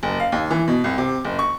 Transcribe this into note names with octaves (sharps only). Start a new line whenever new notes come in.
F#1
F5
D#2
E3
B2
C2
C3
F#1
C#6